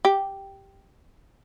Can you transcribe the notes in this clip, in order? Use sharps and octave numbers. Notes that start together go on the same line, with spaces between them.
G4